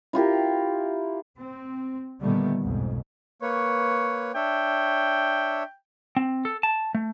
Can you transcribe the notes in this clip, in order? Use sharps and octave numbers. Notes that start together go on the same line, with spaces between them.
E4 F4 G4 A#4
C4
A#2 D3 D#3 G3 A3 B3
B1 F2 G#2
A#3 B4 C#5 C#6
D4 C#5 E5 G5
C4
A4
A5
A3